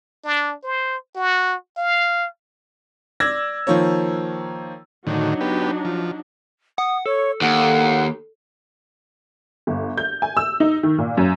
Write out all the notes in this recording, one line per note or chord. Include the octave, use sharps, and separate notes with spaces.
D4
C5
F#4
F5
D5 E6 G#6 A#6
D#3 F3 A#3 C#5
A2 D3 D#3 F#3 D4 D#4
B3 G4
F3
F#5 D#6
A4 C#5
D#2 F#5
G1
G6
G#5
E6
D#4
D#3
A#2
F#2